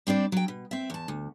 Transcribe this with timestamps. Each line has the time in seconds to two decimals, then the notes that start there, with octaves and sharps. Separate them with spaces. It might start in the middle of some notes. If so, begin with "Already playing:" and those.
0.07 G3 C4 D4 D5
0.32 F#3 G5
0.48 B2
0.71 C4 E5
0.90 E2 A5
1.08 D2